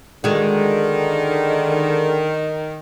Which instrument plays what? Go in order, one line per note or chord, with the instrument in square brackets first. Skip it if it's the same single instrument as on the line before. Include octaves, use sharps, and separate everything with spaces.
[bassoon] D3 [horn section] D#3 [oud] G#3 F#4